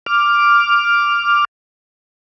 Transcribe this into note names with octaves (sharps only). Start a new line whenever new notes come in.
D6 F6